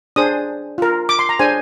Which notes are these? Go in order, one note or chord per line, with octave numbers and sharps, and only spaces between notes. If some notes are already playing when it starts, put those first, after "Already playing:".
D4 G#4 C5 D#6
F4 A#4
D6
C6
A#5
D4 G#4 C5 G#5